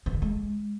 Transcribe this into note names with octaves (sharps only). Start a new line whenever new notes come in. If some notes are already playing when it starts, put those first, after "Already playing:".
E3
D3
G#3